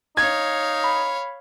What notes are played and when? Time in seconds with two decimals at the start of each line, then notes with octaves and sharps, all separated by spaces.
0.17 D#4 C#5 F5 G#6
0.84 B5